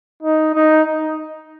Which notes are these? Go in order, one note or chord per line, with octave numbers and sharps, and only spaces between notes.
D#4
D#4